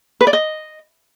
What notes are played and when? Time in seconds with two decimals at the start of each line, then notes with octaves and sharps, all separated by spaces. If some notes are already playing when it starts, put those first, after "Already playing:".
0.21 B4
0.27 D5
0.33 D#5